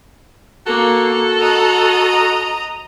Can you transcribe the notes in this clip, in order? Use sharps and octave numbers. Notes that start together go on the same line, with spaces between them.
A#3 F#4 A4
D#5 A#5